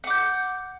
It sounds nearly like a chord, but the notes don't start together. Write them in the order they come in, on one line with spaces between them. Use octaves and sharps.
F#5 D6 G6